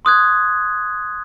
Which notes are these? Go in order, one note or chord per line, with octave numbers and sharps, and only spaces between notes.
C6 D#6 F#6 G#6